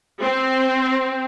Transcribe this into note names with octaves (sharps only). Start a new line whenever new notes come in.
C4